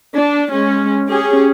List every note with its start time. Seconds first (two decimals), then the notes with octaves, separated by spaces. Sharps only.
0.15 D4
0.52 G#3 C#4
1.09 C#4 G4 G#4